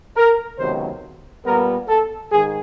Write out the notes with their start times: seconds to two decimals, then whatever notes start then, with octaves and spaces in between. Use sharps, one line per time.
0.16 A#4
0.59 C#2 C3 D#3 F#3 B3 C5
1.45 A#2 G3 B3 A#4
1.87 A4
2.30 G#2 D#3 G#4